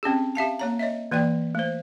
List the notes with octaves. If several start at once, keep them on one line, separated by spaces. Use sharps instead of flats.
C4 C#4 G4 G#4
G4 E5 F5 A5
A#3 C#5 A#5
C#5 D#5 E5
E3 A#3 D5 G5
A3 C5